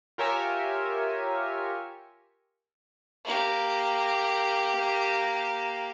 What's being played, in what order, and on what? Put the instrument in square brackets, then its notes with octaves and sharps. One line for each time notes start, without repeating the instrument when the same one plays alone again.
[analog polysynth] F4 G4 A#4 C#5 E5 G#5
[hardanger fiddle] A#3 G4